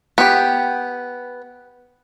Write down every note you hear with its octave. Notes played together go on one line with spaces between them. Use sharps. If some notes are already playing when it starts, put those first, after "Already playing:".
B3 G4